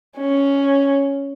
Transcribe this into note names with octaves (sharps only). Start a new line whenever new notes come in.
C#4